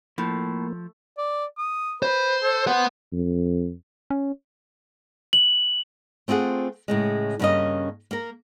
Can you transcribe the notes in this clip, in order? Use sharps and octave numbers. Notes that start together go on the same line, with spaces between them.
A2 F3 A#3
D5
D#6
B4 C5
A4
B4 C5 F#5
F2
C#4
F#7
A3 C4 F4 G#4 F#5
A2 C#3 G#3
G2 C#3 F3 A#3 C#4 D#5
A#3 A#4